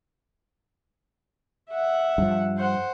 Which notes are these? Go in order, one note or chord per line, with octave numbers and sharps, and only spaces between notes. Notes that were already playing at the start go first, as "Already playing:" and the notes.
E5 F#5
G2 F3
C5 F#5